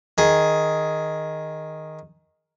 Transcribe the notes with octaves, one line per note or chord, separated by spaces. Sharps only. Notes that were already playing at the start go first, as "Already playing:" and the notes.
D#3 G#4